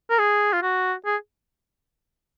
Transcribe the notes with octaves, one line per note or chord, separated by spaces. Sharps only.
A#4
G#4
F4
F#4
G#4